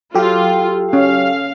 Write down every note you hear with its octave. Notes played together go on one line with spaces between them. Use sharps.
F#3 F4 G4 A4 G5
C#4 F5